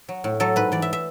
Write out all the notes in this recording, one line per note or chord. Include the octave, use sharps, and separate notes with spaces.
F#3
A2
F#3 A4
G#2 B4
E3 D5
E5
E5